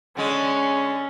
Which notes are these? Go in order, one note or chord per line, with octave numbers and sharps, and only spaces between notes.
D3 G#3 C#4